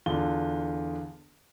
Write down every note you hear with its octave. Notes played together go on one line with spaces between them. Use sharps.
E2 D3 F4 G7